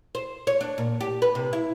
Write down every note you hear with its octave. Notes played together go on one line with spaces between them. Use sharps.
C5
C#5
D4
A#2
G4
B4
C3
E4